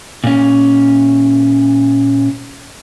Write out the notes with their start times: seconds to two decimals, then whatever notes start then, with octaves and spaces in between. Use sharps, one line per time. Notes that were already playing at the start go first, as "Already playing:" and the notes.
0.24 A#2 C#4